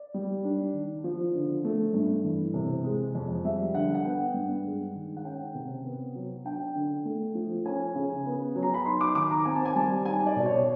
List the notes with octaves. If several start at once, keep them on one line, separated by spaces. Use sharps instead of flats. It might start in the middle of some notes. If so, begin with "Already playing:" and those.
Already playing: D5
G3
D4
D#3
F3
D3
A3
G2
E3
C3
G#3
F2
G3 E5
D3 F#5
F#5
B3 G5
G2
G#3
D#3
F#5
C#4 G5
C3
B3
F#3
D4 G5
D3
A3
F3
C#4 G#5
C#3
B3
F#3
A#5
B5
D#4 C6
D6
D#3 D6
A#5
C4 G#5
A5
G#5
G3 A5
D#4 G#5
D5
B2
C#5